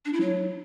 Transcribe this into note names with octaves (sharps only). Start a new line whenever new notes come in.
D4
E4
F#3